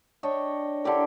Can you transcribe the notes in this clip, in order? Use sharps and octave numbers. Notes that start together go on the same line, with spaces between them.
D4 C#5 D#5 G5
D3 E4 G4 A#4